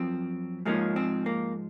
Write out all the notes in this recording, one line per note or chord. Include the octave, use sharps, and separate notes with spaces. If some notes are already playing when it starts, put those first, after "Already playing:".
Already playing: F#2 F3 C4
G#2 F3 G#3 A#3 C#4
C4
A#3